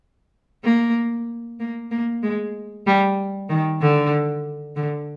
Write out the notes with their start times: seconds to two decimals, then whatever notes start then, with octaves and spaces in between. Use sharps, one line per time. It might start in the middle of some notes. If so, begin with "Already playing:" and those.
0.65 A#3
1.60 A#3
1.91 A#3
2.23 G#3
2.87 G3
3.50 D#3
3.82 D3
4.76 D3